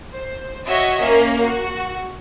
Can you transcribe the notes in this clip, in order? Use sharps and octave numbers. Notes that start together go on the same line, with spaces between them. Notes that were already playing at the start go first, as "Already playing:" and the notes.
C5
F#4 C#5 D#5 E5
A#3 C#4
F#4